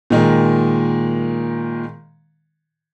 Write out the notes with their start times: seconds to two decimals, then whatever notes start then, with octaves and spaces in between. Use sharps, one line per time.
0.10 A#2 D#3 G#3